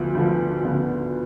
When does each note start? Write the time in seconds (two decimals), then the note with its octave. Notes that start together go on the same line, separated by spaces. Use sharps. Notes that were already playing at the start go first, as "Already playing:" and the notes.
Already playing: D2 D3 F3 B3
0.15 D2 D3 F3 B3
0.64 D2 D3 F3 B3